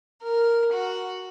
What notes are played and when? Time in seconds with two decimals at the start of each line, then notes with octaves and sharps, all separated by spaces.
0.21 A#4
0.72 F#4